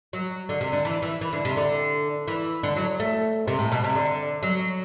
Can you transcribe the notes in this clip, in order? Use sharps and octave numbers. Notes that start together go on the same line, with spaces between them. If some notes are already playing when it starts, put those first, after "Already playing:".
F#3
D3
C3
D3
E3
E3
E3
D3
C3
D3
E3
D3
F#3
A3
C3
A2
B2
C3
D3
F#3